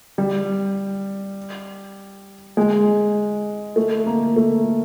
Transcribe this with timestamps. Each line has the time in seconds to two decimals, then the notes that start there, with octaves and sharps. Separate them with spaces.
0.18 G3
2.57 G#3
3.76 A3
4.06 A#3
4.36 A3